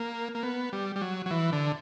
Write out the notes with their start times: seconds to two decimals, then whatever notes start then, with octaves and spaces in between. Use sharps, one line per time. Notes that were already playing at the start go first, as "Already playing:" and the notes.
Already playing: A#3
0.35 A#3
0.43 B3
0.73 G3
0.96 G3
1.01 F#3
1.26 F#3
1.31 E3
1.52 D3